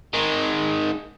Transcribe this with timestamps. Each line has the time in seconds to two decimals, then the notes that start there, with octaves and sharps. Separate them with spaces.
0.13 D#3 G#3